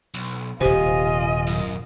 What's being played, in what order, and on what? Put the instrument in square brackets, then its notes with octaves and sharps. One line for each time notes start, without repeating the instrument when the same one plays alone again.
[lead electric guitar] B1
[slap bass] D#1 C3 [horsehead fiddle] F4 D#5 [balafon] G4 C5 [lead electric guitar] G#5
[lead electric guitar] F#2